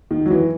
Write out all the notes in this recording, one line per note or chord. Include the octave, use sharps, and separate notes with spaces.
D#3
F#3
E3